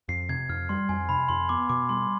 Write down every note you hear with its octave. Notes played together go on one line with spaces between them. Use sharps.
F2 C7
C3 G#6
F2 F6
G3 C6
F2 G#5
C3 B5
F2 C6
B3 D6
B2 D6
G3 C6